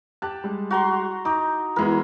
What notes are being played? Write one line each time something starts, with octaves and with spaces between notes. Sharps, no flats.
G4 A5 F#6
G3 G#3
F#4 A#5 C6
D#4 D6
E3 G#3 B3 E4 A#4